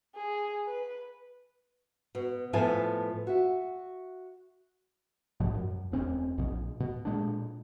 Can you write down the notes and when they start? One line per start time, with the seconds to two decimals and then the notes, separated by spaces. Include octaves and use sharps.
0.16 G#4
0.67 B4
2.15 B2
2.53 A2 F3 B3 E5 G#5 A5
3.27 F#4 E5
5.40 B1 G#2 B2 F3
5.54 F#2
5.92 E1 C4 C#4
6.38 A#1 B2
6.80 B2
7.05 A#2 G#3 D4